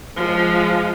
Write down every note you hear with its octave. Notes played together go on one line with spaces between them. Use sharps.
F3 G#3